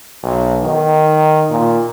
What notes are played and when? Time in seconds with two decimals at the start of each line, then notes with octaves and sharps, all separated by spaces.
0.23 B1
0.63 D#3
1.50 A#2